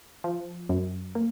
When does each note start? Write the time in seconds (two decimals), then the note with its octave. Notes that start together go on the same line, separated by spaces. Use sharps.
0.24 F3
0.69 F#2
1.15 A#3